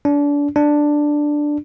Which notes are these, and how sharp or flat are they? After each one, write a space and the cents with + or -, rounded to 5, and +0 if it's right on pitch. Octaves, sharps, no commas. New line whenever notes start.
D4 -30
D4 +5